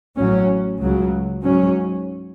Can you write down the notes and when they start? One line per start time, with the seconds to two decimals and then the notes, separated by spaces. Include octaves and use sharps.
0.18 A1 A2 F#3 C#4
0.81 C#2 C#3 F#3
1.44 G#2 F#3 C#4